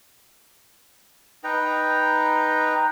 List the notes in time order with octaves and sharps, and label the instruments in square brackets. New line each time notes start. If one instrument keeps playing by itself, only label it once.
[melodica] D#4 B4 G5 A#5